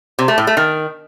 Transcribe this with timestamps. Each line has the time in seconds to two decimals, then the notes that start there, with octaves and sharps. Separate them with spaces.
0.19 C3
0.28 A3
0.38 A2
0.47 A3
0.57 D#3